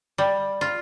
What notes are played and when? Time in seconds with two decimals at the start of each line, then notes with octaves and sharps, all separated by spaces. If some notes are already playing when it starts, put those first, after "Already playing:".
0.18 G3
0.61 F4